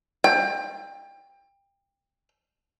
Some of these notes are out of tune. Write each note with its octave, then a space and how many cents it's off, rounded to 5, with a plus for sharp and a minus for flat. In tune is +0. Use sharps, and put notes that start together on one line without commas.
G5 +25